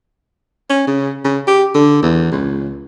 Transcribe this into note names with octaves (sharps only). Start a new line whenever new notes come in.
C#4
C#3
C#3
G4
D3
E2
C#2